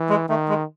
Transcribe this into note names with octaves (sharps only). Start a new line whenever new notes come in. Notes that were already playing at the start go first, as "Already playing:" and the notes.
Already playing: E3
G#3
D#3 A3
G#3